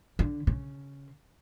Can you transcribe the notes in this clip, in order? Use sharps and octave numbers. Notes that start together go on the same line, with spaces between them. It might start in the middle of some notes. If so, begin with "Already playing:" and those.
D3
C#3